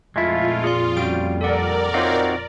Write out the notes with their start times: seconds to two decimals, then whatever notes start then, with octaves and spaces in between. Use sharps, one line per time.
0.16 F2 A#2 G#3 A3 E4 F4
0.64 G#4 D5 C6
0.97 G3 C#4 F#4 D7
1.41 A4 A#4 D5 F#5
1.94 C4 D#4 F4 F#4 C#5 F5